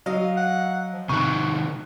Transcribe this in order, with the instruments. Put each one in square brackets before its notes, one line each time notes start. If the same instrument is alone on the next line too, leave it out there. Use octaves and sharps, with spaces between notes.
[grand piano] F#3 [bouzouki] D#5 F5
[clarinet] F#5
F3
[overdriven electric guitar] C3 D#3 [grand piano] C#6 F#6